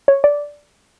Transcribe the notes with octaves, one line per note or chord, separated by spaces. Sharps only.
C#5
D5